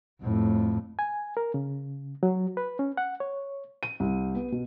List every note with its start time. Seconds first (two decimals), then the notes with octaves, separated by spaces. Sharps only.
0.22 F2 A2
0.99 G#5
1.37 A#4
1.54 C#3
2.23 F#3
2.57 B4
2.79 C#4
2.97 F#5
3.20 C#5
3.83 D#7
4.00 C2
4.35 B3
4.52 B2